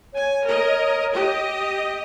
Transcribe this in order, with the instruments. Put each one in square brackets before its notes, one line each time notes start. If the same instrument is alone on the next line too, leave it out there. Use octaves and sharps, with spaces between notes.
[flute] C#5 [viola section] G#5
[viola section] A#4 D#5
G4 D#5